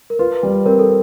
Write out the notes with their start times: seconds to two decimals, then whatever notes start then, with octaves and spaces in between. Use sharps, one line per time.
0.10 A#4
0.19 F4 B4
0.43 G3
0.66 C4 A#4
0.79 A4